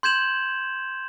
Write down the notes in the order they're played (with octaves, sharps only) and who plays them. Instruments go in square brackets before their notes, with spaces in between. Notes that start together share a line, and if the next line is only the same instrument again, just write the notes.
[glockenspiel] C6 G6 G#6 E7 F#7